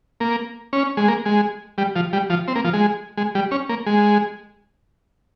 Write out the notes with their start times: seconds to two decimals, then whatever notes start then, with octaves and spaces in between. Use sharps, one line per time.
0.20 A#3
0.73 C#4
0.97 G#3
1.08 A#3
1.26 G#3
1.78 G3
1.96 F3
2.13 G3
2.30 F3
2.48 C4
2.56 A#3
2.65 F3
2.73 G#3
3.17 G#3
3.35 G3
3.51 C#4
3.69 A#3
3.86 G#3